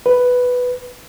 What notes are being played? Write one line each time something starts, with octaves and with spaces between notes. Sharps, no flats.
B4